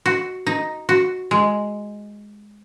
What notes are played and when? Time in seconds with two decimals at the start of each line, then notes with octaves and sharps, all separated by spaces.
0.06 F#4
0.47 D#4
0.89 F#4
1.31 G#3